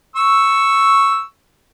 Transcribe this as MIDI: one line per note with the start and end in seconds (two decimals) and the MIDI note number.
0.16 1.21 85
0.16 1.21 88